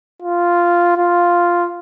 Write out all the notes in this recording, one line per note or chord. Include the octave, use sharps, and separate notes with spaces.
F4
F4